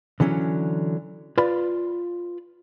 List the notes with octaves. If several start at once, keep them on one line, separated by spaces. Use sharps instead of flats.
D3 E3 F#3 C#4
F4 B4 D5 B5